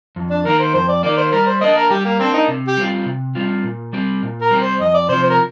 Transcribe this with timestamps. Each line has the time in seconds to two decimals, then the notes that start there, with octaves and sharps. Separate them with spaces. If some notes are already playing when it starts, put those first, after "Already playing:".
0.16 F2
0.30 D4
0.45 D#3 A#3 A#4
0.59 C5
0.74 F2 C5
0.89 D5
1.03 D#3 A#3 D5
1.18 C5
1.32 G3 A#4
1.46 C5
1.61 A#3 D4 D#5
1.76 A#4
1.90 G3 G4
2.05 A#3
2.19 A#3 C4 D4
2.34 D#4
2.48 C3
2.68 G4
2.77 G3 C4 F4
3.06 C3
3.35 G3 C4 F4
3.64 A#2
3.93 G3 C4 G4
4.22 A#2
4.42 A#4
4.51 G3 C4 G4
4.61 C5
4.80 F2 D#5
4.94 D5
5.09 C3 F3 C5
5.23 C5
5.30 A#4